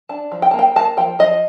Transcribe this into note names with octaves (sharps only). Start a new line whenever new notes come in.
D4 A5
F3
G5
A#3 A5
G5
A#3 A5
F3 G5
F3 D#5